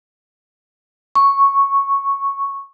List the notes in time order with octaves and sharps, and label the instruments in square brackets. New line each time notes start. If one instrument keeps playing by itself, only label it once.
[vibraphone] C#6